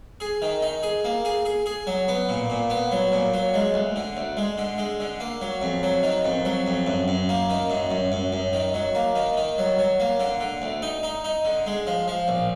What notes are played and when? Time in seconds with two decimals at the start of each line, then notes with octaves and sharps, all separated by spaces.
0.20 G#4
0.42 D#3
0.62 D#4
0.83 G#4
1.05 A#3
1.25 G#4
1.45 G#4
1.66 G#4
1.87 F#3
2.08 B3
2.29 A#2
2.50 A#2
2.70 B3
2.92 F#3
3.12 A#2
3.34 F#3
3.54 G#3
3.74 D2
3.96 D3
4.17 D2
4.37 G#3
4.58 D3
4.78 G#3
5.00 D3
5.20 A#3
5.41 F#3
5.62 F2
5.83 F#3
6.03 D#3
6.25 F2
6.45 F#3
6.66 F2
6.86 F#2
7.08 F#2
7.29 A#3
7.50 D#3
7.70 F#2
7.91 F#2
8.12 F#2
8.32 F#2
8.53 D#3
8.74 F#3
8.95 A#3
9.15 D#3
9.37 D#3
9.58 F#3
9.79 F#3
10.00 A#3
10.20 D3
10.40 D3
10.62 D2
10.82 D#4
11.03 D#4
11.24 D#4
11.45 D3
11.66 G#3
11.87 F3
12.08 F3
12.28 A#1